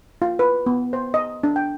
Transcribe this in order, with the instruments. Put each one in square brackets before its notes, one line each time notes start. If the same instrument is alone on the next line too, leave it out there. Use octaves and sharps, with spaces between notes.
[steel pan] F4
B4
B3
C5
D#5
D4
G5